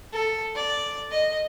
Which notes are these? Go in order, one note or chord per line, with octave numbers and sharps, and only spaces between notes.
A4
D5
D#5